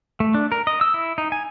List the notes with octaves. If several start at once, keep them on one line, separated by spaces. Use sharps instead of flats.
A3
D4
A#4
D#5
E6
E4
D#4
G#5